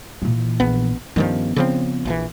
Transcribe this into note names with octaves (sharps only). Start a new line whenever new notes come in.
A#2 E3
A#1 B3
G2 D#3 F3 B3 C#4
C#3 F3 C4
A#1 C#3 E3